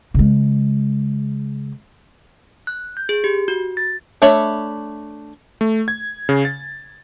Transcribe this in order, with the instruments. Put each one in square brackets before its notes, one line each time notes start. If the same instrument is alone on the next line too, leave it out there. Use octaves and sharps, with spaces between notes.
[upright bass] C#3 G#3
[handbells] F#6
G6
G#4
G4
F#4
A6
[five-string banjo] A3 D4 C#5 E5 B5
[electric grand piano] A3
G#6
C#3
A6